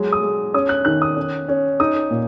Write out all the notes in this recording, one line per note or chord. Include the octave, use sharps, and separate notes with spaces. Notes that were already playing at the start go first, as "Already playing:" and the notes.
Already playing: F#3 G#3
D#6
G#3
C#4 D#6
F#6
D#3 F#6
D#6
C#4
C#4
D#4 D#6
A#2